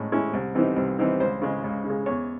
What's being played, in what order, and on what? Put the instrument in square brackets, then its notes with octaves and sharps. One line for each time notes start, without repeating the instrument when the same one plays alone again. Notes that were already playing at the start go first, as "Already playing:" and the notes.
Already playing: [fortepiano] A2 G#3 C#4 E4
G#3 C#4 E4
C2
C3 E3 C4 D#4
C2
C3 E3 C4 D#4
C#2 C5
C#3 G#3
C#2
C#3
G#3
E2 C#5